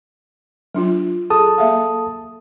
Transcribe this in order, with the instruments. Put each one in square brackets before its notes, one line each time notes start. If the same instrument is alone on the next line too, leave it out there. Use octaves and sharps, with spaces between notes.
[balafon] F#3 D4 F4
[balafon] G#4 [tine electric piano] A4 A5 D#6
[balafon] A#3 E5 F5